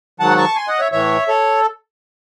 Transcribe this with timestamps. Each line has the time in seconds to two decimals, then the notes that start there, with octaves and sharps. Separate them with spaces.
0.20 G#2 D#3 F#3 F#5 A5
0.38 A5 C#6
0.56 G#5 C6
0.68 D#5 F#5
0.80 C#5 E5
0.92 A2 E3 C#5 E5
1.28 A4 C#5